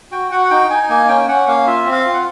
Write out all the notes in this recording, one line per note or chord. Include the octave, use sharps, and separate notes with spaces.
F#4 G5
F#4 F#5
F#5
D#4 G5
D#4 G#5
A#3 G#5
C#4 G5
C#4 F#5
A#3 F5
F4 E5
C4
F5
F4
F#5